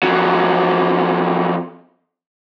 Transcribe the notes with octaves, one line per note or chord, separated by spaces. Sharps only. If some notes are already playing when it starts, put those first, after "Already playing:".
F2 F#3